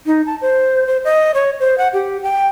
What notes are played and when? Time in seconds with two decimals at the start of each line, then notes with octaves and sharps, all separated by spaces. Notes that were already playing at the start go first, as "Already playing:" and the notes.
0.06 D#4
0.26 A5
0.41 C5
0.87 C5
1.05 D#5
1.34 C#5
1.60 C5
1.78 F#5
1.93 G4
2.23 G5